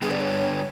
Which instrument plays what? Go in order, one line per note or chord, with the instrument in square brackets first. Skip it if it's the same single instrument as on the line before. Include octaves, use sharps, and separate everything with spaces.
[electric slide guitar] G2 D3 G3 B3 [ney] G#4
[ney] D5
C#5